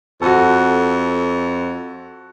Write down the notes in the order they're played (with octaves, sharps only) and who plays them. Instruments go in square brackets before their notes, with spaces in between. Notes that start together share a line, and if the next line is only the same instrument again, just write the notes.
[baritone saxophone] F2 [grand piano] F#4 A4